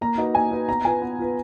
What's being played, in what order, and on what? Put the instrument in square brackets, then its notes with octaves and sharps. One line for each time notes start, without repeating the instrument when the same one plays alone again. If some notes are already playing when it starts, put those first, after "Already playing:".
[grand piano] A#3 [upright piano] A#5
[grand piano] D#4 F#4 B4 D#5
[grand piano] A#3 [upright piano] G#5
[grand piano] D#4 F#4 B4 D#5
[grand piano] B3 [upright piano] A#5
[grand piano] F4 B4 [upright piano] G#5
[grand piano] B3
F4 B4